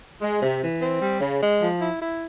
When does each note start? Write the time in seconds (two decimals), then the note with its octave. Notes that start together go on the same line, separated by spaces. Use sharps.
0.22 G#3
0.42 C3
0.62 E3
0.82 C4
1.01 G3
1.21 C#3
1.42 G#3
1.61 F3
1.81 E4
2.02 E4